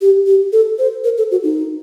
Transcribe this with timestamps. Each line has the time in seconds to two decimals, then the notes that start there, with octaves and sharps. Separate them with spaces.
0.01 G4
0.27 G4
0.52 A4
0.79 C5
1.04 A#4
1.18 A4
1.31 F#4
1.44 D#4